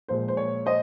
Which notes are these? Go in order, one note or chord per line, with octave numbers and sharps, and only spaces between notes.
A#2 F3 G#3 C5
C5
C#5
C5 D#5